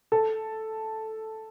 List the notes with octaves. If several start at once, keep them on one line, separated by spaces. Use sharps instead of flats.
A4